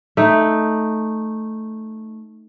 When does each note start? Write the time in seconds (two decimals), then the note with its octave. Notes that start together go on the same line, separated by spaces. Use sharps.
0.17 A3 D#4